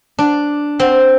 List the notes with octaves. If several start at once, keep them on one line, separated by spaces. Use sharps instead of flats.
D4
C4